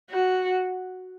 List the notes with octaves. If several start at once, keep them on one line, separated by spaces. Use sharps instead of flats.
F#4